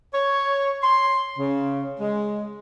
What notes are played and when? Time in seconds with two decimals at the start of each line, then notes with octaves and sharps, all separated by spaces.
0.14 C#5
0.83 C6
1.39 C#3
2.00 G#3